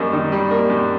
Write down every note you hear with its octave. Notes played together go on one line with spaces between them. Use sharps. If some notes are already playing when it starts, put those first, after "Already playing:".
Already playing: F#2 D#3 G3 A#3
D#3
G3
A#3
F#2